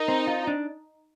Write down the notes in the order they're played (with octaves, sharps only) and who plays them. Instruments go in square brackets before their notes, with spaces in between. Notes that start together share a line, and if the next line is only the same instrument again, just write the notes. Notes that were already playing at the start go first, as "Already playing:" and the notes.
Already playing: [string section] D#4 [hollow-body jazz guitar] A#4
[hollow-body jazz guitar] C4
F4
D4